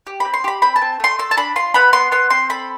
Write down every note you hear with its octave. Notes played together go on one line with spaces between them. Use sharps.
G4
C4 B5
C6
G4 B5
C4 B5
A5
C4
A3 C6
A4 C6
A5
D4 B5
F4 C6
B3 B5
B3 C6
B3 C6
C4 C6
A4 B5